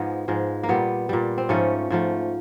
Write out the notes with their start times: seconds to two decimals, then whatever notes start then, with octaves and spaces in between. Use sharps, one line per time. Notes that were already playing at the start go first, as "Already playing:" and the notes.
Already playing: G#2 F3 G#3 B3
0.28 G#2 F3 G#3
0.63 A#3
0.69 A#2 G3 B3
1.09 A#2 G3
1.38 C4
1.49 G#2 F3 A3 C#4
1.90 G#2 F3 A3